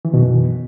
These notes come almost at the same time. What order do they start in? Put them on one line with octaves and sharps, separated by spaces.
E3 D#3 B2 F#2